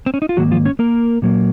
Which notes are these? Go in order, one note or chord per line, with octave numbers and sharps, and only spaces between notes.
C4
C#4
D#4
F4
G#2 D#3 F#3 A#3 F#4
F3 F4
C#4 C#5
A#3 A#4
A#2 F#3 A#3